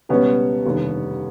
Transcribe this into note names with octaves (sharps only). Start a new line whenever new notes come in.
C#2 B2 G3 B3 C#4
F1 D#2 D3 G3